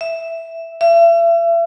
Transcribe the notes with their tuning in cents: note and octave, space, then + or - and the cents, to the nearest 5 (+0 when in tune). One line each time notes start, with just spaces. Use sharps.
E5 +0
E5 +40